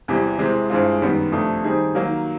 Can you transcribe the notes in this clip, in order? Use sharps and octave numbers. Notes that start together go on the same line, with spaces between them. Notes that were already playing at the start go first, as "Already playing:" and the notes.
E2 C3 E3 G3
C3 E3 G#3 C4
G2 E3 G#3 C4 F4
F#2 D#3 G3 B3
F2 C3 F3 A3 D4
D#3 G3 C4 D#4 G#4
D#3 F#3 A#3